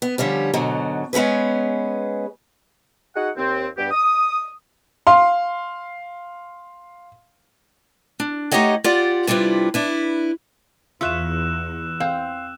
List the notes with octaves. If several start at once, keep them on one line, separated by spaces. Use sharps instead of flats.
B3
D3 F3 G3 C#4
G#2 B2 D3 F#3
G#3 B3 C#4 G#4 B4
D#4 F#4 G#4 F#5
D#2 C4
G2 G3 B3 G4
D#6
F5 C6
D4
A3 D#4 G4 C#5 D#5 F#5
F4 G4 D5 F#5
C3 G3 D4 E4 F4 B4
D4 E4 B4
E2 F4 C#5 E5 E6 F#6 E7
C4 F5